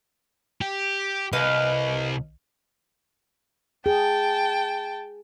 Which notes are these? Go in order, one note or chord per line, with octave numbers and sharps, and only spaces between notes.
G4
C2 B4 D#5 F5
G#4 G5 A5